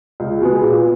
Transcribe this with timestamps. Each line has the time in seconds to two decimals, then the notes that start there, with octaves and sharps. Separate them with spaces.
0.20 C#2
0.41 B2 G#3 B3
0.62 A#2